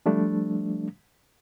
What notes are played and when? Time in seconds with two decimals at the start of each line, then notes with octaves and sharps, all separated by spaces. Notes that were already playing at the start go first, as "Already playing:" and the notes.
0.06 F3 G3 A3 D4